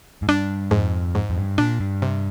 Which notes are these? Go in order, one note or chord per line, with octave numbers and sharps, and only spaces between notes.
G#2
G2 D4
F2 G#2
G#2
F2
G2
A#2 D4
G2
C3